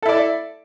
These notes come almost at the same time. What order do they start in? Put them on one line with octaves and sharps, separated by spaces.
A4 E4 D5